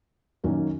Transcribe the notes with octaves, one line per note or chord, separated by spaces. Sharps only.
F#2 D#3 A#3 C#4 F#4